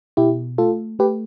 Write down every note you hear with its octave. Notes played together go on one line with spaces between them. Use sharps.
B2 E4 G4
A3 F4 A4
A3 G4 B4